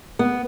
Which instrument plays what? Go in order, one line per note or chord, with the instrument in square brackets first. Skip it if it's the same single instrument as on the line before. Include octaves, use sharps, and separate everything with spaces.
[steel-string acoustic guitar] B3